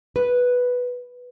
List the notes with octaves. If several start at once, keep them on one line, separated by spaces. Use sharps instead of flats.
B4